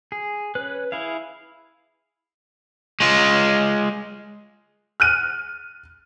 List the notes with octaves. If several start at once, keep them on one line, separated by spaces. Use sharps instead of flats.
G#4
C#4 B4 F#6
E4 G#4 F5
G#3 F4
F6 F#6 D#7